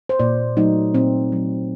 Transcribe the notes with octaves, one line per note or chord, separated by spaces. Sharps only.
C5
A#2 D5
F#3 A3 D#4
A#2 C4
F#3 A3